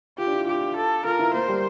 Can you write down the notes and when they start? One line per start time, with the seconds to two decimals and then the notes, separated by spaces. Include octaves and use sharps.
0.18 F4 G4
0.27 D4
0.32 E4
0.47 F4 G4
0.76 A4
1.04 F4 A#4
1.19 E4
1.33 A#3 C5
1.48 G3